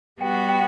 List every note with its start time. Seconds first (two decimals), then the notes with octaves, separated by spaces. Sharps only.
0.21 G3 B3 F#4 G5
0.35 F#5
0.49 G5